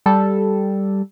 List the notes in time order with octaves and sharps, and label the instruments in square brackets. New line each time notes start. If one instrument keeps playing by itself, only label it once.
[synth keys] G3 A4